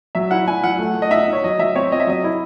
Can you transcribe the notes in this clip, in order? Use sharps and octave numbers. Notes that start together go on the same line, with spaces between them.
F#3 E5
E4 F#5
E4 G#5
F#3 F#5
A3
A3
D#5
D#4 E5
D#4 C#5
F#3 D#5
F#3 E5
C4 C#5
C4 D#5
E5
F#3 D#5
E4